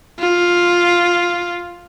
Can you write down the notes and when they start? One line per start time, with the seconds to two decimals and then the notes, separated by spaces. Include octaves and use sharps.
0.19 F4